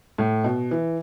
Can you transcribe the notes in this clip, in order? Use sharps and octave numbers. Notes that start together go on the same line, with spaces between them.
A2
B2
E3